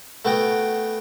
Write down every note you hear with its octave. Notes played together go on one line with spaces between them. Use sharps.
A3 B3 F#4 G5